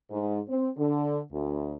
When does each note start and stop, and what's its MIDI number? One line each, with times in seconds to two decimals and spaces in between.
0.11 0.40 44
0.48 0.69 60
0.78 1.20 50
1.32 1.75 38